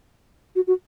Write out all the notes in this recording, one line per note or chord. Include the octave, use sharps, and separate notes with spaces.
F#4
F#4